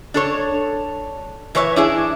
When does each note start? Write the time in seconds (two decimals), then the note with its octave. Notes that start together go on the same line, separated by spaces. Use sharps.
0.14 D4 A4 C#5
1.55 E3 B4 C#5 D#5 E5
1.76 D4 E4 G#4